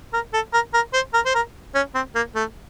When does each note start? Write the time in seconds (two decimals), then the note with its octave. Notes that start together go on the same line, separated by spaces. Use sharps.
0.13 A#4
0.34 A4
0.53 A#4
0.74 A#4
0.94 C5
1.14 A#4
1.26 C5
1.35 A#4
1.75 C#4
1.95 C4
2.15 A#3
2.35 A3